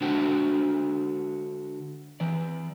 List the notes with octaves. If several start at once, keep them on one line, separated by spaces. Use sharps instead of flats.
D3 G#3 D4 F#4 C5 G5
E3 D5